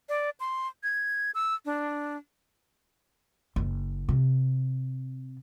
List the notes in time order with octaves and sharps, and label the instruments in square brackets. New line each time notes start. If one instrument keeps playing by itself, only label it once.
[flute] D5
C6
G#6
E6
D4
[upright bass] F#1
C3